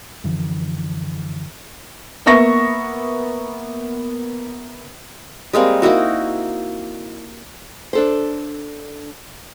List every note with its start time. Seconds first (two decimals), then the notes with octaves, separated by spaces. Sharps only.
0.24 F#2 D3 E3 F3
2.26 A#3 B3 E5 C#6 A#6
5.53 G3 G#3 A#3 C4
5.82 A#3 D#4 E4 F#4
7.93 D4 A4 C5